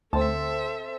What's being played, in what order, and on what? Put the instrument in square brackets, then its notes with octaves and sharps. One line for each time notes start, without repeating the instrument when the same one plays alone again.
[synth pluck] D2 [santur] C4 A5 [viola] A4 E5